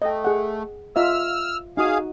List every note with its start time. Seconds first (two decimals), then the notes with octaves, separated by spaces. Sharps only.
0.02 A3 D#5 G5
0.24 G#4 F#5
0.96 F4 D#5 E5 E6 F6
1.77 D#4 F#4 G#4 F5 D#6